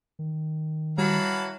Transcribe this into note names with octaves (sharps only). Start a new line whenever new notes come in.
D#3
E3 F#3 G3 F5 A5 B5